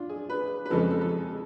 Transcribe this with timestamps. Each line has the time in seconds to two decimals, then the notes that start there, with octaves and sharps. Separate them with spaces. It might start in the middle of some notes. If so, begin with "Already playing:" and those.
Already playing: D4 F4
0.09 G#4
0.30 B4
0.66 B4
0.70 F2 C#3 F3 G#3 A4
0.91 A4
1.01 A4
1.11 G#4